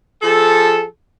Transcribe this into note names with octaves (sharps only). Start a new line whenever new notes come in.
F3 G#4 A4